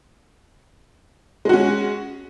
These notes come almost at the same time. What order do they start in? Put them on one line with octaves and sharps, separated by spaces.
G#3 F#4 C#4